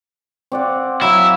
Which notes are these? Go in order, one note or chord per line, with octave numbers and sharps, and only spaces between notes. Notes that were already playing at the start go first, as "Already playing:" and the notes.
C4 D5 F#5
F#3 E4 F5 D6